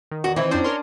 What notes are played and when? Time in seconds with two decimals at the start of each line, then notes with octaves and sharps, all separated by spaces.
0.11 D#3
0.24 E2 F#4
0.36 E3 C4 E4
0.51 F2 C#4 D4 C5
0.64 A#4 C#5 C6